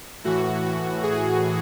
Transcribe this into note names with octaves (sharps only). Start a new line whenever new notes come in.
A2 E3 F#4
G#4